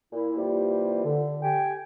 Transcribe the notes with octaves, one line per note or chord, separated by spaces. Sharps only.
A#2 E4
C3 E3 G3 A#3 F4 G4
D3
G4 G5 G#5